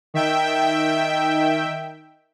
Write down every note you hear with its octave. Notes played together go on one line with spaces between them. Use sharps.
D#3 E5 G5